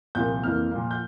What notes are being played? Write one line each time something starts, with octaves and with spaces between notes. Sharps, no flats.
C2 A#2 F3 A#3 G6
F2 E3 A#3 F6
A#2 F3 A#3
G6